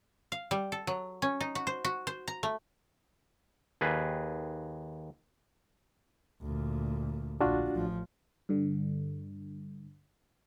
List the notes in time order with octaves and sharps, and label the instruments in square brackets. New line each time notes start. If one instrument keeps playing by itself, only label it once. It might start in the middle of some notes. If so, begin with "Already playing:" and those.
[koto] F5
G3
A4
F#3
C#4
D#4
F#4
C5
F#4
C5
A#5
A3
[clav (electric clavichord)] D#2 G#4 B4
[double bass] D2 A#2
[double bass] A#1 [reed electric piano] D4 F4 F#4
[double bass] A1 F3
[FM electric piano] G2 D3